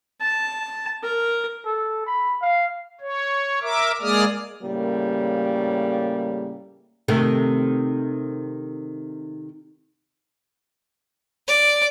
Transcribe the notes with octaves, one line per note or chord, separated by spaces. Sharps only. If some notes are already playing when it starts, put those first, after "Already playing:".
A5
A#4
A4
B5
F5
C#5
A#4 E5 D6
G#3 A#3 G#4 D5 D#6 F6
A2 C#3 G3 A#3
C3 D#3 A3
D5